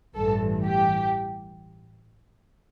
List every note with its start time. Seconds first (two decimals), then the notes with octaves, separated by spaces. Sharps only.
0.15 A1 G2 E3 A4
0.63 G4